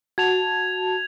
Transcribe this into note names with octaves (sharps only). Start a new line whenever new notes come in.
F#4 A5 G#6 F7